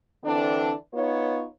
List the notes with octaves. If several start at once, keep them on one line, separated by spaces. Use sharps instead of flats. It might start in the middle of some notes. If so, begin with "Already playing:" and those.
D3 E3 C4 D4
B3 D#4 F4 C#5